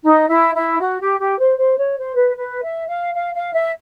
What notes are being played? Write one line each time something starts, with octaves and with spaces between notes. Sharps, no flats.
D#4
E4
E4
F#4
G4
G4
C5
C5
C#5
C5
B4
B4
E5
F5
F5
F5
E5